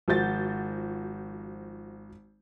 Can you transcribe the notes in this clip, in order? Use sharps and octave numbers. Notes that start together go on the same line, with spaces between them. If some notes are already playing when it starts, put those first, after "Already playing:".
G#1 F3 F#4 G6 A6